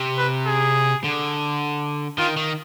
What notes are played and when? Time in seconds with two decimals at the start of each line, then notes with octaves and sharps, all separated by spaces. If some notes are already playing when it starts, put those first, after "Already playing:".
Already playing: C3
0.18 B4
0.47 G#4
1.04 D3
2.18 D#3 F4
2.37 D#3